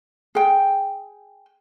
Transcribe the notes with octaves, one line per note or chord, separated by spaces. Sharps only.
G#4 G5